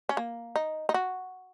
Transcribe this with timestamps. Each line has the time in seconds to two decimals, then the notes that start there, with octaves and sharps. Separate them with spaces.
0.09 C#4
0.17 A#3
0.56 D#4
0.89 D#4
0.94 F#4